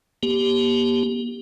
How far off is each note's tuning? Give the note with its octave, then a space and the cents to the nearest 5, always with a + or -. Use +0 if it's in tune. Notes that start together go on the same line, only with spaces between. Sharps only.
A#3 +45 G4 +0